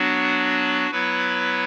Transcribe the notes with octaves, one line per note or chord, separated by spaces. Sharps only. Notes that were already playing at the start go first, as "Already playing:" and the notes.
Already playing: F#3 B3 D4 F#4
F#3 B3 E4 B4